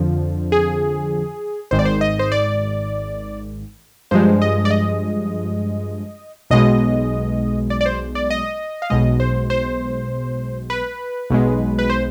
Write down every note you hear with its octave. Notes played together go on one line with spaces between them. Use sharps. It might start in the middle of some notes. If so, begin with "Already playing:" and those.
Already playing: F2 D3 F3
G#4
G#1 G#2 D#3 C5
D5
C5
D#5
C5
D5
G2 F3 G#3 C5
D#5
D5
D#5
B1 B2 G#3 D#5
D5
D5
C5
D5
D#5
F5
B1 B2 G#3 D#5
C5
C5
B4
B1 B2 G#3
B4
C5